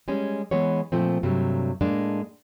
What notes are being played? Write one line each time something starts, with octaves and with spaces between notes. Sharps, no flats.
G3 G#3 C#4
E3 G#3 B3 C#5
A#2 F3 A3 C4
G2 C3 F#3 A3
A2 G#3 A#3 D4